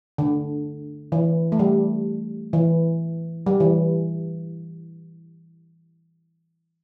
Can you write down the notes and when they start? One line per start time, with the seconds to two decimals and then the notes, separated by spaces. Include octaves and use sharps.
0.18 D3
1.12 E3
1.52 A3
1.59 G3
2.53 E3
3.46 G3
3.60 E3